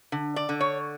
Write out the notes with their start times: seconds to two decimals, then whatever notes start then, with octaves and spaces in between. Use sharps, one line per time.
0.12 D3
0.36 D5
0.49 D3
0.61 C#5